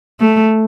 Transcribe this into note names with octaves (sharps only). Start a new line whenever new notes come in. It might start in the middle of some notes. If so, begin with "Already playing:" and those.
A3